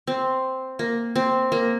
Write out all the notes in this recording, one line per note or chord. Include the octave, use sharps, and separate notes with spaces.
C4
A#3
C4
A#3